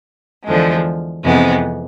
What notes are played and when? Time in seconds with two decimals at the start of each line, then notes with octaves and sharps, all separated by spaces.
0.45 E2 D3 F3 G#3
1.23 F2 C3 E3 G#3 B3